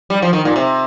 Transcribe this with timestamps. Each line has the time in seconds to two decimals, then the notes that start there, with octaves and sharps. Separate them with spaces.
0.10 G3
0.22 F3
0.33 D#3
0.45 A#2
0.56 C3